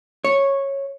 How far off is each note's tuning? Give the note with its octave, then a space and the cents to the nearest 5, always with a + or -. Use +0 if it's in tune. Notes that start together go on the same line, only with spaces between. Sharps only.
C#5 -10